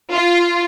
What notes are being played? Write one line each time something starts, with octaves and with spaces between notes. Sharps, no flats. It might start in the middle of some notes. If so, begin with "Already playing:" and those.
F4